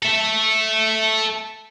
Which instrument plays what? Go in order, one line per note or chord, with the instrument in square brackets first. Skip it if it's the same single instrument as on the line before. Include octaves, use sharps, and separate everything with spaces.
[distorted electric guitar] A4 E5